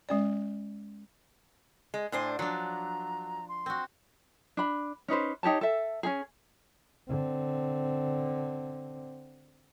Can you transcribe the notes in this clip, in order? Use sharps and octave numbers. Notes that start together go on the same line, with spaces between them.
G#3 C#4 D5
G#3
A2 D4 C5 G#5
F3 F#3 D4 A#5
C6
C4 F#4
D4 B5
C#4 D#4 B4 C5
D#4 G4 C#5 A5
A4 E5
C#4 D#4 G#4
D3 C4